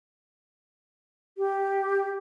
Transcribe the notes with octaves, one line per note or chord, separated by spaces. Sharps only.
G4